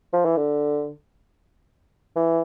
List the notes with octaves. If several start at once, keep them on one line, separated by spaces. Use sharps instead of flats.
F3
E3
D3
E3